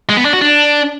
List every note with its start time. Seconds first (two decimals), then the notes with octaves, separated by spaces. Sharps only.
0.09 G#3
0.17 B3
0.25 D4
0.33 F#4
0.41 D4